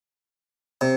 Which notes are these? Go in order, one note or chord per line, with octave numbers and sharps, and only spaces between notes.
C3